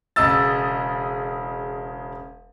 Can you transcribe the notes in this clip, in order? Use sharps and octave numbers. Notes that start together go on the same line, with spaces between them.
E1 C#3 D#5 E6 A6